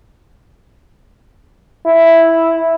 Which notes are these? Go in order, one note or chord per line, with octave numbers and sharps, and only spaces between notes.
E4